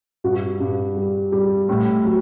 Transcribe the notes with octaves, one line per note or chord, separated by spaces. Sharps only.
G2 F#4
G2
G3
G3
A2
F#3